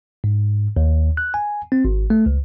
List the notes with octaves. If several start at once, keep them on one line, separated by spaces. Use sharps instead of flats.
G#2
D#2
F#6
G#5
C4
G#1
A3
C#2